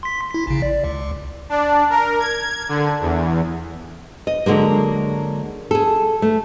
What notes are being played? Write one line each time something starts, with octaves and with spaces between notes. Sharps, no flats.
C6 B6
E4 B6
A1 C#3
D5
C#2
D4
A#4
G#6
D3
E2
D#5
D3 F#3 G#3 A#3
G#4 A4
A3